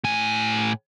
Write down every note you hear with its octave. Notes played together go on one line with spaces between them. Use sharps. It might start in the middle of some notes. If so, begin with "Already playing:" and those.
A2 G#5